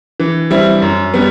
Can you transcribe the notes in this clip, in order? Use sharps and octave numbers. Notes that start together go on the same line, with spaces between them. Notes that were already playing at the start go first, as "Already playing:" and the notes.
E3
G3 C4 E4
F#2
G3 B3